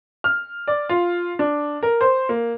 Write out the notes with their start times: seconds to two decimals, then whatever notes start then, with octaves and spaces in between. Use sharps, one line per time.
0.24 F6
0.67 D5
0.89 F4
1.39 D4
1.83 A#4
2.01 C5
2.29 A#3